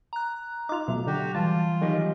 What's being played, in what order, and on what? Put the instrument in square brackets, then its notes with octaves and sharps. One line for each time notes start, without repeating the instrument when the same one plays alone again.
[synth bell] A#5 F#6
[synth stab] D#4 F4 [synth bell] D6 F7
[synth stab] B2 A3 [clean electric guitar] F#3
[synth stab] D3 [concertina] F#4 G4
[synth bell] E3 G3 [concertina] F4 [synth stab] A5
[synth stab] D#3 [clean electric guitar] F#3 G4 D#5